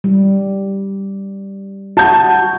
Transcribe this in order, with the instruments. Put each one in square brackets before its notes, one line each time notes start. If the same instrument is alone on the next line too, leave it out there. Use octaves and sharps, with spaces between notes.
[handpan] G3
[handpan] F#4 [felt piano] A5 G6